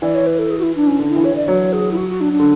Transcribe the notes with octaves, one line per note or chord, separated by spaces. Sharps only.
E3 D5
C#5
B4
A4
G#4
F#4
E4
D4
C#4
D3 D4
E4
E3
C#5
E3 D5
F#3 C#5
G#4
E4
F#4
F#4
D4
D4
D3